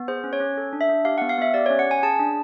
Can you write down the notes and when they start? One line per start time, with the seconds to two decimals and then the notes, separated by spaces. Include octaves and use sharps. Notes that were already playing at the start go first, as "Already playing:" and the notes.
Already playing: B3
0.08 G#4 C5
0.24 C#4
0.33 C#5
0.40 C#4
0.57 A4
0.73 D4
0.81 E5
0.89 D4
1.05 G4 F5
1.18 B3 F#5
1.29 F5
1.38 B3 E5
1.54 G4 D5
1.66 C#4 C#5
1.79 F#5
1.87 C#4 G#5
2.03 G#4 A5
2.19 D4